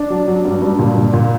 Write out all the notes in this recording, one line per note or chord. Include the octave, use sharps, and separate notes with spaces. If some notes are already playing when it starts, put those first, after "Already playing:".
Already playing: D4
F#3
F#3
G2
G2
A#2
A#2
A#2